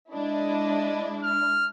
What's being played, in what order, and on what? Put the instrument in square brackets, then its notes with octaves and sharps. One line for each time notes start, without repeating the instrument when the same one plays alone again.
[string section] G#3 D4 E4 [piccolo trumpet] D#5
[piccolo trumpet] F6